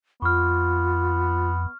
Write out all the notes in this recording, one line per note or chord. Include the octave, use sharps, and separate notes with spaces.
F2 B3 F4 C#6 F6